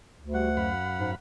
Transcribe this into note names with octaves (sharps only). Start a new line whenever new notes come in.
D2
G3 F#4 F#5
F#2 F5 B5
G#2